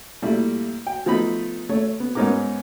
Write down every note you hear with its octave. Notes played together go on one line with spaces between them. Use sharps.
A#2 G3 A3 E4
G5
F3 A3 B3 D#4 B5
A3 C#5
B3
G#2 B3 C#4 D#4 A#4 D6